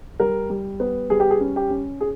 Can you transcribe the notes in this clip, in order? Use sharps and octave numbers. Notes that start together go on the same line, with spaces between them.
G3 A#4
G3
B3
G3 G#4
G4
G#4
C#4
G4
C#4
G#4